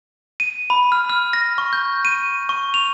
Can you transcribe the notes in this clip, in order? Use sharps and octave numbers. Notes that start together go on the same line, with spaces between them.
D#7
B5
F6
F6
A#6
C#6
G6
D#7
C#6
F7